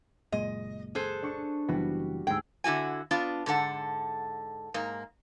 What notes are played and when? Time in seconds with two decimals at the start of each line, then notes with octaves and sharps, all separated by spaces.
0.32 F#1 A#2 G#3 D#5
0.95 G#4 A4 C5 F#6
1.23 D4 C#6 C#7
1.68 F#1 E3 G3 B3 F#4
2.27 D2 G#2 G#4 G5 E6
2.64 D3 E4 F#4 G#5
3.11 B3 D4 F4
3.46 G#2 D3 A4 F#5
4.74 G#2 A#3